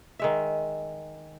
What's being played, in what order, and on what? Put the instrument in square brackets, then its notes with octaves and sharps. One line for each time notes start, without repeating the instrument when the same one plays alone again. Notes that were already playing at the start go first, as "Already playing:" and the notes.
[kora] D#3 G#3 E5